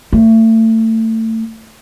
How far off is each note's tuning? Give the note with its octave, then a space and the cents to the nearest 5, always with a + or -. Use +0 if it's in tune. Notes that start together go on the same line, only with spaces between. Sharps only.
A3 +30